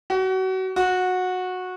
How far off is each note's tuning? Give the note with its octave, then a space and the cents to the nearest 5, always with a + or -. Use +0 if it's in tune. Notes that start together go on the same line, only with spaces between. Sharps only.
F#4 +30
F#4 -15